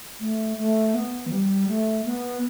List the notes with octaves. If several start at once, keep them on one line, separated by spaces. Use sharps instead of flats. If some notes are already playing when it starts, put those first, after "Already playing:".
A3
A3
B3
E3
G3
A3
B3